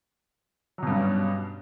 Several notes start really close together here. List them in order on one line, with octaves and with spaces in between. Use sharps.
F#3 B2 G2 C#4